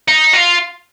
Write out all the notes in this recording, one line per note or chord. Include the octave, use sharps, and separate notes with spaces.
D#4
F4